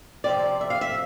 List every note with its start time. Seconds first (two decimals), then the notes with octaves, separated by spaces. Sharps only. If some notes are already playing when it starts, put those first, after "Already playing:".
0.24 C3 F3 C4 D5
0.61 E5
0.70 F5
0.81 E5